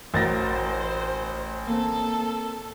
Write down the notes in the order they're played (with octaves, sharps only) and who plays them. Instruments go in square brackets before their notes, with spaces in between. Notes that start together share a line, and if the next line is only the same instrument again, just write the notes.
[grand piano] A1 A6 A#6 [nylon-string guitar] F#4 A#4 [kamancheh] C5
[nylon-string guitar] A#3 C4 [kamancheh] A4